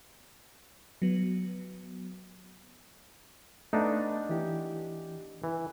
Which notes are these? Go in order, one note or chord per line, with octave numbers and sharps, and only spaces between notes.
F#3 B3
A3 B3 D4 D#4
E3 G4
E3